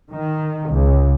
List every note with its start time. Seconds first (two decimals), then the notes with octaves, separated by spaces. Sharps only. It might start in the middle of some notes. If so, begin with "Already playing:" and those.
0.12 D#3
0.69 C#2